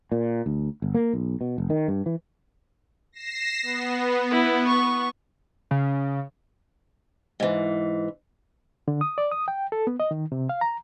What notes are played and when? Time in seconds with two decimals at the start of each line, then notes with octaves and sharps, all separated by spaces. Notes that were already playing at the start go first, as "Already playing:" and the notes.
0.12 A#2
0.46 D2
0.82 G1
0.94 A#3
1.13 B1
1.41 B2
1.58 F1
1.70 D#3
1.88 G2
2.06 E3
3.12 A#6 C7 E7
3.63 B3
4.31 E4
4.67 C#6
5.71 C#3
7.40 G#2 E3
8.88 D3
9.01 D#6
9.18 D5
9.32 D#6
9.48 G5
9.72 A4
9.87 B3
10.00 D#5
10.11 D#3
10.32 C3
10.49 F5
10.61 A#5